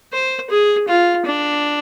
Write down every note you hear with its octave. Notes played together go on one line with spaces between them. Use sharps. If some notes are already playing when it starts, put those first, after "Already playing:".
C5
G#4
F4
D4